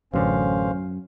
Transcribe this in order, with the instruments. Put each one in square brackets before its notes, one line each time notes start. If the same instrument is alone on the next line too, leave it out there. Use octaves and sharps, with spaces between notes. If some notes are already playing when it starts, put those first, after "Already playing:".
[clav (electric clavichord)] A1 D3 [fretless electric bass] F#2 [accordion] C#4 C5 F5